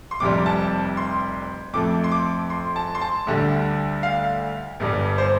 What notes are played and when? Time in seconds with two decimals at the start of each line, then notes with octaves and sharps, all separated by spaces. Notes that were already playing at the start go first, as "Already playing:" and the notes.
0.11 C6
0.20 F1 F2 C3 G3 D6
0.46 A5
0.97 C6
1.73 F2 F3 A3 D6
2.04 C6
2.12 D6
2.50 C6
2.76 A5
2.95 C6
3.01 A5
3.27 D2 D3 G3
4.03 F5
4.80 G1 G2 G3
5.18 C5